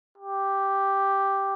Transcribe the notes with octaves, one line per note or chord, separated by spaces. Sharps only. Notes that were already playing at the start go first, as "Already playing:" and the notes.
G4